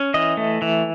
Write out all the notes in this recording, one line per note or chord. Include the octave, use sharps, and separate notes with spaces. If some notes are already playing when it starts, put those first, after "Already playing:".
Already playing: C#4
E3 D#5
A3
E3